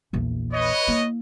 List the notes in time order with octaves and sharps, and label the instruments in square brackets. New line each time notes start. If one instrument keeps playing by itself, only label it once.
[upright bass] A#1 E2
[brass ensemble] B4 C#5 D#5
[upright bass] A#3 E4